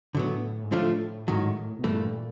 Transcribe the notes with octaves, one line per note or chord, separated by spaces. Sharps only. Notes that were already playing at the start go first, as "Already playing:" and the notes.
A2 D3 F#3 B3
G#2
A2 D3 F3 A3 D4 F4
G#2 D#3 F#3
B2
G2 A#2 E3 A3